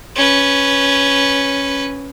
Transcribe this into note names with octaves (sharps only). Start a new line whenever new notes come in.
C#4 B4